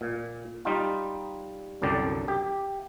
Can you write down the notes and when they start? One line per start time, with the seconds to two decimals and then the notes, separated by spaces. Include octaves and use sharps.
0.01 A#2
0.65 G3 D#4 F4
1.82 C2 F#2 D3 D5 G5
2.28 G4